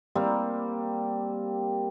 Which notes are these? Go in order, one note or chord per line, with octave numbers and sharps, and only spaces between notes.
G3 A#3 C4